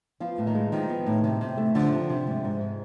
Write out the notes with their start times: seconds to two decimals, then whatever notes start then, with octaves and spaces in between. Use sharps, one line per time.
0.20 F3 B3 F4
0.38 A2
0.47 D#3 D#4
0.55 G#3
0.72 D#3 F3 D#4
0.90 B3
1.06 A2
1.24 C3
1.41 C3
1.57 A3
1.75 D3 F3 D4
1.92 C3
2.10 C3
2.27 G#2
2.44 G#2
2.61 G#3